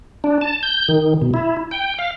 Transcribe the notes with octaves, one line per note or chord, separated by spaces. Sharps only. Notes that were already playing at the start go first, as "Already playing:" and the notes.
D4
A5
G6
D#3
B2
E4
G5
F5